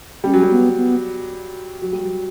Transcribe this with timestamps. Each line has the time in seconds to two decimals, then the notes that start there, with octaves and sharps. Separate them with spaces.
0.24 G3 C#4
0.34 F#3
0.42 G3
0.51 B3
0.77 B3
1.82 F#3
1.93 G3
2.02 F#3